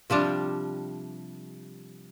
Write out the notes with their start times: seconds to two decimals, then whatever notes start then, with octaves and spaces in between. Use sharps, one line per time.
0.10 C3 F3 G3 D4